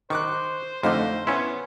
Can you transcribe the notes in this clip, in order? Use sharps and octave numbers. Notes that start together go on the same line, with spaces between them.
D#3 C5 C#6 D6 F#6
F2 D3 A3 D#4 C5 F5
B3 C#4 E4 C6